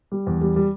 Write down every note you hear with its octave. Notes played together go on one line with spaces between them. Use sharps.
G3
E2
G3
G3